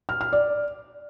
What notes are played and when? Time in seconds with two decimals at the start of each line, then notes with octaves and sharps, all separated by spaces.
0.09 F6
0.21 F6
0.33 D5